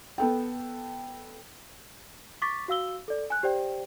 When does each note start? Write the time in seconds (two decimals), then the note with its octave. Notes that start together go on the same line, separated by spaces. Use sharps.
0.18 B3 A4 G5
2.42 C#6 D6 A6 B6
2.68 F#4 F5 E6 G7
3.08 A4 D5
3.30 G#5 F#6
3.43 G4 C5 D5 G5